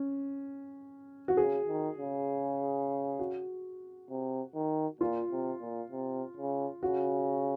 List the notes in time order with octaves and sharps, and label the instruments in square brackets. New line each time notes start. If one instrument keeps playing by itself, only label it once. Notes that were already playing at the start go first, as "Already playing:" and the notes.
Already playing: [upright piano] C#4
F#4
[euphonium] C#3 [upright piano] G#4
[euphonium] D#3
C#3
[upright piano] F#4
[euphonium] C3
D#3
[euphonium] A#2 [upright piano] F4
[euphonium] C3
A#2
C3
C#3
[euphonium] C#3 [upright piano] F#4